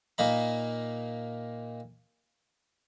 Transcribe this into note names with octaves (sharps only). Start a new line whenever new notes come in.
A#2 A#3 D#4 B5